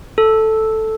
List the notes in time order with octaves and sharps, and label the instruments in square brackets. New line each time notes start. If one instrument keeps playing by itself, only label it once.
[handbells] A4